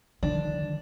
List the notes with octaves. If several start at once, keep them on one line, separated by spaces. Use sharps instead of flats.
D3 D#3 F3 G3 D4